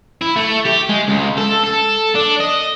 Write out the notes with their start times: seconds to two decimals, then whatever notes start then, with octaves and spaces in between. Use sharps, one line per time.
0.21 E4
0.36 A3
0.65 G4
0.90 G#3
1.08 C#2
1.38 A4
1.64 A4
2.15 D4
2.40 D#5